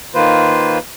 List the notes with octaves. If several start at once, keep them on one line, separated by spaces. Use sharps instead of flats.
D#3 A#3 F4 B4 C5